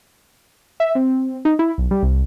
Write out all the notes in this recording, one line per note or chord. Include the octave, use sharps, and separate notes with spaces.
E5
C4
D#4
E4
B1
G3
C2